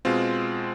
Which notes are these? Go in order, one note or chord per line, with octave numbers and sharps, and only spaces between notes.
B2 G#3 C4 F4